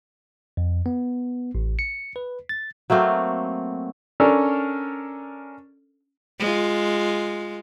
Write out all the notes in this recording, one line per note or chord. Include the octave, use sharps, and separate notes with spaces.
F2
B3
A1
C#7
B4
A6
F#3 A3 A#3 C4
C#4 D4 A4 A#4
G#3 F4